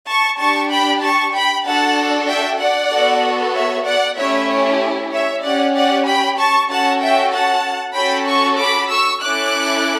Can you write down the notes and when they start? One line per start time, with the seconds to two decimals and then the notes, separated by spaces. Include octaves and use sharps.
0.08 A5 C#6
0.39 D4 G4 A5 C#6
0.71 G5 B5
1.03 A5 C#6
1.34 G5 B5
1.66 D4 F#4 A4 F#5 A5
2.29 E5 G5
2.60 D5 F#5
2.93 B3 F#4 A4
3.55 C#5 E5
3.86 D5 F#5
4.18 A3 C#4 E4 G4 C#5 E5
4.50 C#5
5.13 C#5 E5
5.44 C#4 G4 D5 F#5
5.76 D5 F#5
6.07 G5 B5
6.38 A5 C#6
6.70 C#4 F#4 A4 F#5 A5
7.02 E5 G5
7.33 F#5 A5
7.97 C#4 F#4 A4 G5 B5
8.28 A5 C#6
8.60 B5 D6
8.91 C#6 E6
9.22 C#4 E4 A4 D6 F#6